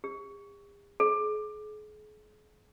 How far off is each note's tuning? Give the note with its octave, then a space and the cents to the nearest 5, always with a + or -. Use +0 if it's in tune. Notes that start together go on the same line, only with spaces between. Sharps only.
G#4 -45
G#4 +40